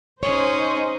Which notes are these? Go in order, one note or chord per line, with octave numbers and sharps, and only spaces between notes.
C#4 D#4 G#4 C5 C#5